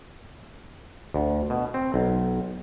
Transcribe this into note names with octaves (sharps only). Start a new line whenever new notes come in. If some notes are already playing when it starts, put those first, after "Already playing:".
D2
B2
C4
B1